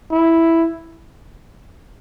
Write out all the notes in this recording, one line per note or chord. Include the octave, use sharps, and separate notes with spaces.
E4